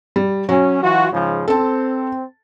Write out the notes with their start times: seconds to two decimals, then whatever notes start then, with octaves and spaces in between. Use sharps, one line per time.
0.16 G3
0.49 F#3 C#4
0.82 E3 F4 F#4
1.12 G#2 C#3 F3
1.48 C4 A4 A5